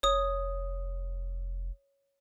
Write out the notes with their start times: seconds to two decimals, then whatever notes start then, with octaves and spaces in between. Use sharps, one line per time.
0.03 F1 C#5 D#6